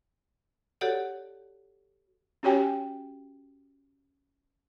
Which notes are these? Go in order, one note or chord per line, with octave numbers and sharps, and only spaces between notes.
F#4 G4 A4 C#5 D5 F#5
C#4 F#4 G4 C#5 G5 G#5